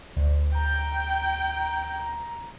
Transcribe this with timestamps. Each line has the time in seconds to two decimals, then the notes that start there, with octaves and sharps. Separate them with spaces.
0.16 D2
0.54 G5 A#5